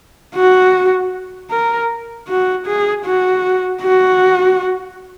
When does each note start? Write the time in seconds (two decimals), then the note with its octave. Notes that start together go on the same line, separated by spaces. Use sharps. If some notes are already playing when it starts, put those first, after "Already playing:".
0.35 F#4
1.50 A#4
2.28 F#4
2.66 G#4
3.05 F#4
3.82 F#4